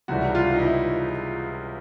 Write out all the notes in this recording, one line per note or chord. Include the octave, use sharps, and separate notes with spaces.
C#2 C3 E3 G3 F#4
F4
D#4
E4